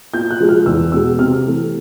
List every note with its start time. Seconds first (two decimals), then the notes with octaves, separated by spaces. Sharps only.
0.14 A#2 G6
0.31 F#6
0.40 F3 G#3
0.49 F6
0.66 E2 E6
0.92 B2 G#3 E6
1.19 C3 F6
1.46 E3 A3